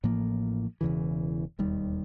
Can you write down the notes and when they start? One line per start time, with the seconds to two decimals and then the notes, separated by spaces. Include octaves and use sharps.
0.04 A1 A2 F3 A#3
0.81 E1 E2 C#3 E3
1.59 E1 D#2 D#3 G3